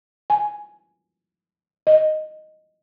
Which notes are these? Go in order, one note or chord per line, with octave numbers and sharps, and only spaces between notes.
G#5
D#5